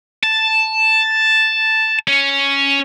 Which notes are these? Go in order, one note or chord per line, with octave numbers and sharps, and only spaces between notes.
A5
C#4